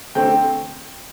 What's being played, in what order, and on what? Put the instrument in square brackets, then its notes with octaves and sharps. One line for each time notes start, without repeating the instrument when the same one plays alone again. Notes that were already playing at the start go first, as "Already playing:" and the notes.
[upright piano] D3 A3 C4 G5